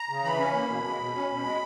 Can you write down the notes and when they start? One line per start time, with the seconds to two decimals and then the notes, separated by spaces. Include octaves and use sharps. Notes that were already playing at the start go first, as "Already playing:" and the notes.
Already playing: A#5
0.09 C#3
0.24 E3 B5
0.39 C#4
0.54 A#3
0.69 B2
0.84 G#3
0.99 B2
1.14 C#4
1.29 B2
1.44 G#3